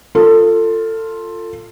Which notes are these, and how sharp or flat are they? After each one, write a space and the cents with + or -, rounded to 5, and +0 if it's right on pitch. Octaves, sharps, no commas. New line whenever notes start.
F4 +0 A4 +25